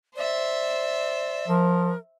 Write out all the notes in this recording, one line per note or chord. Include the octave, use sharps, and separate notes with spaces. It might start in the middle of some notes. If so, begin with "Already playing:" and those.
C5 D5 E5
F3 A#4